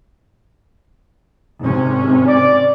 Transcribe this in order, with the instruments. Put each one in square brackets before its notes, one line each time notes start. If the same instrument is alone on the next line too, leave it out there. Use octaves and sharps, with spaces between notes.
[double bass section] G#1 C3 C#4
[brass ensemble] D5